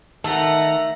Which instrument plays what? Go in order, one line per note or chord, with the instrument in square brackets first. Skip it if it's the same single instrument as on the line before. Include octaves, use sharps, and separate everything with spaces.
[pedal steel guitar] D#3 [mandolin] A3 [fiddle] F#5 A#5 [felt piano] A5